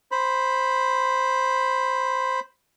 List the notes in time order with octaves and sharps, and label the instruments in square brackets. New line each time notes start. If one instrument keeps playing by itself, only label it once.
[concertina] C5 B5